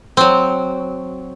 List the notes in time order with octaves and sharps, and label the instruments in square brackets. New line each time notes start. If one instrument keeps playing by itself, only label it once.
[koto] F#3 C4